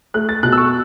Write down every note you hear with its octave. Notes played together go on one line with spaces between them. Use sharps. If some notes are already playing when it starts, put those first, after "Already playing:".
A3 F#6
A6
B2 F#6
E6
C#6